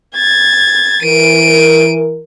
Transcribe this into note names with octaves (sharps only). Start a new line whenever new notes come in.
G#6 A6
E3 A#4 D7 D#7